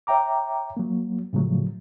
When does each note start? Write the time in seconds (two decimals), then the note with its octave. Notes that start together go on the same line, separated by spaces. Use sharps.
0.07 C#5 E5 G5 A#5 D6
0.77 F#3 A#3
1.33 A2 C#3 F3 F#3 A3